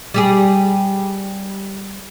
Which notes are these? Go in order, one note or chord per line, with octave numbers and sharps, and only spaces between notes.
G3 G4 G#4